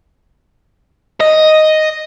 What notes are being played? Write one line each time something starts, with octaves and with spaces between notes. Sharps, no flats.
D#5